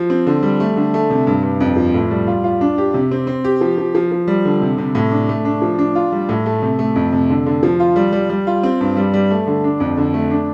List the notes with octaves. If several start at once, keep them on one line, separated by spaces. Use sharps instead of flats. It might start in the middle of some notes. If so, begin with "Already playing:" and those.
Already playing: F3
C4
D3
G3
A3
D3
A3
C3
G2
G2
F2
F3
A2
G3
F4
F4
D4
G4
C3
C4
C4
G4
F3
F3
F3
F3
G3
D3
C3
C3
A2
D4
A3
D4
F3
D4
F4
G3
A2
A3
C3
A3
F2
C3
D3
D3
F3
F4
G3
G3
G3
F4
C4
G2
G3
G3
A3
D3
D4
F2
D3
A3
D4